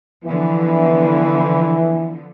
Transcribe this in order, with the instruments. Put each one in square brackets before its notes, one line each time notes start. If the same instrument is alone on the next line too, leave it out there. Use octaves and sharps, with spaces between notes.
[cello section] D3 F3 B3 [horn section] E3